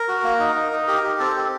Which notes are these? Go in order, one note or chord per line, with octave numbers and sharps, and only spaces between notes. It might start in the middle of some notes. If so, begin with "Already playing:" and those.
Already playing: A#4
F#4
A#3
D#4
D#4
D#4
G4 A#4
G4
C4 A4
G4